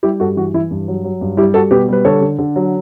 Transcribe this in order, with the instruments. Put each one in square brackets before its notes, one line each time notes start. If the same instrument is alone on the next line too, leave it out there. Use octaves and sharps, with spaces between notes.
[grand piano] G3 E4 G4
G2 F#4 A4
E3 F#4
E3 E4
G2
F#3
F#3
G2
G3 E4 G4
G3 F#4 A4
B2 G4 B4
G3 B4
D3 A4 C#5
D3
D3
F#3